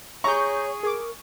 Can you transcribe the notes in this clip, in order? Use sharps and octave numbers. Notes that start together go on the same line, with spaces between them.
G#4 C#5 A#5 C#6 G6
G#4 A#4 D6